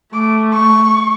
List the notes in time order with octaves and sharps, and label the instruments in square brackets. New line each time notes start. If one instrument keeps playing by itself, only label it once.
[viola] A3 [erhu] D6
[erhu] C#6